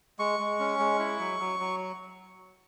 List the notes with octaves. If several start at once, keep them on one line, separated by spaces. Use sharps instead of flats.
G#3 C#6
G#3
C#4
G#3
E4
F#3
F#3
F#3